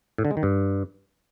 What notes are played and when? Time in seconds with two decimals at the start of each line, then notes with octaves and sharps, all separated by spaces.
0.18 A2
0.25 D3
0.31 G#3
0.37 D#3
0.43 G2